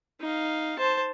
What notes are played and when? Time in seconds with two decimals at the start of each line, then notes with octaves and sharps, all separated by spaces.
0.21 D#4 F5
0.79 C5 A5